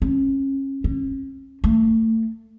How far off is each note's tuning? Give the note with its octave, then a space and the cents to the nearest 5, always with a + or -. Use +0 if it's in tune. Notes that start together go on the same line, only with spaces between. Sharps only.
C#4 -30
C#4 -40
A3 +30